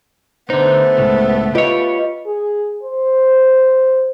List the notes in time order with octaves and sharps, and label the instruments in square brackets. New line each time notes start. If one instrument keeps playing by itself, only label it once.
[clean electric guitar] D3 D#4 [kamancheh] A3 B3 [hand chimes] C5
[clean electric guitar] C#2 A2
[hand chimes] F4 B4 D#5 [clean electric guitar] G4 C#5
[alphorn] G#4
C5